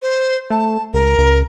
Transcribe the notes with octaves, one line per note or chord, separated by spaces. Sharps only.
C5
A3 A5
C#2 A#4
C#2